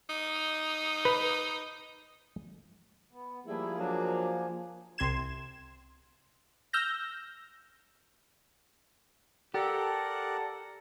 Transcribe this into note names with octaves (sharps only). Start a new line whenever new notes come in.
D#4
B4
B3
F3 G3 A3 A#3 E4 G#4
F#3 D4
C2 C3 C6 G#6 E7
E6 F6 G6 A#6
G4 A4 A#4 D5 F#5